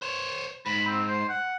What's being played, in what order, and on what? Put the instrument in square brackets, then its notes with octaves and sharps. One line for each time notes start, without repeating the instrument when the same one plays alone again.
[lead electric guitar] C5 C#5
[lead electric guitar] G#2 [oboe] B5
[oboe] C4
C5
F#5